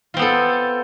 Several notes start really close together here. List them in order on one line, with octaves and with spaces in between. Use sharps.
F4 C4 B3 A4